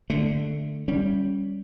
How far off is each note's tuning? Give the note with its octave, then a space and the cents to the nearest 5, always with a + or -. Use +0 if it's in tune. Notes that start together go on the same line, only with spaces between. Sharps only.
D3 +10 A3 +0
G3 +0 C#4 +0